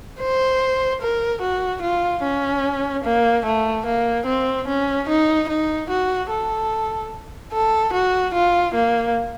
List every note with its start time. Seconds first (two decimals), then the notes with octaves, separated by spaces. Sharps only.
0.20 C5
1.01 A#4
1.41 F#4
1.82 F4
2.23 C#4
3.04 A#3
3.45 A3
3.86 A#3
4.26 C4
4.67 C#4
5.08 D#4
5.48 D#4
5.89 F#4
6.30 A4
7.52 A4
7.93 F#4
8.34 F4
8.74 A#3